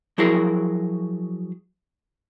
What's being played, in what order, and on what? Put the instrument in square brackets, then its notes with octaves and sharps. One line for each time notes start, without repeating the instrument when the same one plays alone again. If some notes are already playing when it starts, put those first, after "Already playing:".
[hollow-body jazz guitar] F3 F#3 E4 F#4 G#4 A#4